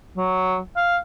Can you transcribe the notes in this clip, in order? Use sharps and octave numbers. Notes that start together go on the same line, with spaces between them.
F#3
F5